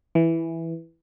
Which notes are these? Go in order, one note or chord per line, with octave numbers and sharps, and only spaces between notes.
E3